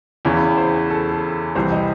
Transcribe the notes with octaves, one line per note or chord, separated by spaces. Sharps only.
E2 C#3 E3 C#5
C5
A4
A4
C2 C3 E3 C4 C5
D#5